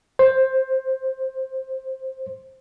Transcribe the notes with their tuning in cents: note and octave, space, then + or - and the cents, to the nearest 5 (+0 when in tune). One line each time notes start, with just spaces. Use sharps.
C5 +10